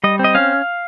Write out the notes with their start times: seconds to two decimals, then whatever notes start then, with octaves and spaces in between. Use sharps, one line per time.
0.04 G3 D#5
0.19 C4
0.24 D#5
0.35 C#4 F5